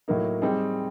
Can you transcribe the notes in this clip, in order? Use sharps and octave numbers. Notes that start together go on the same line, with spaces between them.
A2 F#3 A#3 D#4
G3 C4 D#4 G#4